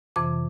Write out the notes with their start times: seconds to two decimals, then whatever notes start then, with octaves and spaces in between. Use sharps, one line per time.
0.16 F2 C3 E3 D6